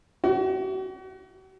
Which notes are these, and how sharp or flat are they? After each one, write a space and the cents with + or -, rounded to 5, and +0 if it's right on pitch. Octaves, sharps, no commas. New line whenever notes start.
F#4 +40